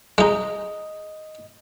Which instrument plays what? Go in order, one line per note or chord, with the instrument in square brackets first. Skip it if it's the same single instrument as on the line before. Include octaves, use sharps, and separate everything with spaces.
[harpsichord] G#3 D#4 [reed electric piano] D#5